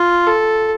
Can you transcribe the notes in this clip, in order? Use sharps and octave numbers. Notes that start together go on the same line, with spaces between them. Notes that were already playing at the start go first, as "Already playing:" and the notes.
Already playing: F4
A4